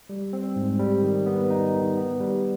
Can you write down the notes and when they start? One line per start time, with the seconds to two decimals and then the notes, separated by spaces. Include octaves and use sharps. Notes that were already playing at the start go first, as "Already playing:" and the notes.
0.09 G3
0.33 C4
0.56 G#2
0.79 G3
1.03 D#3
1.26 B3
1.50 D#4
1.74 D#3
1.97 B3
2.20 G3